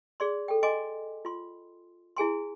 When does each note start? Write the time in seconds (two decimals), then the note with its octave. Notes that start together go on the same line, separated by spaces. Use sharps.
0.20 G#4 D5 C6
0.48 A4 G5
0.63 D#5 G#5 C6 D6
1.25 F4 C6
2.17 E4 G#4 G#5 C6